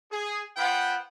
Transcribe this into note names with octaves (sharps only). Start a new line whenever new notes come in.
G#4
B3 F4 B4 C5 F#5 G5